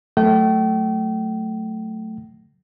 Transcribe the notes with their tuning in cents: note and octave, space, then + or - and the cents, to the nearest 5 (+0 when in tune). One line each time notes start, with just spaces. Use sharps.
F#3 +0 A3 +0 G5 -35